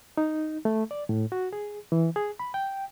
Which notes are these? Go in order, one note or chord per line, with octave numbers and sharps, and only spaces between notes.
D#4
A3
D5
A2
F#4
G#4
E3
G#4
B5
G5